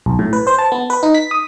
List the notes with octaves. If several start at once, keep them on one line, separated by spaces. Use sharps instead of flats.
B1
A2
B4
C5
A5
B3
B4
D#4
B6
D#6